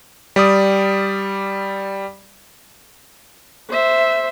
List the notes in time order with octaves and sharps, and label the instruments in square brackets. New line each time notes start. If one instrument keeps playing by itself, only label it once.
[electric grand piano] G3 D5 D#6
[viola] C5 E5